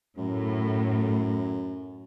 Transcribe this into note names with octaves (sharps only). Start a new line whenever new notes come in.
F#2 A2